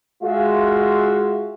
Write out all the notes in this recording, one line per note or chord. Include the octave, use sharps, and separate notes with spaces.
G#3 F4 F#4 E5 F5